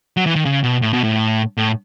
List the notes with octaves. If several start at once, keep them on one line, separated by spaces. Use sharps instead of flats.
F#3
E3
D#3
C#3
B2
A2
B2
A2
A2